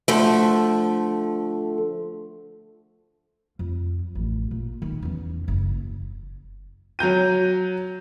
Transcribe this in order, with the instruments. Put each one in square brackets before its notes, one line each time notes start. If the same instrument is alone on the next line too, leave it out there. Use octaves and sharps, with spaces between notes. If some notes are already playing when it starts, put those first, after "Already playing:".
[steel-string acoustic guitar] D3 F3 A3
[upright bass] F2
A1
A#2
D#3 D#4
E2 C#4
F#1
[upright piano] F#3 A#5 G6 D#7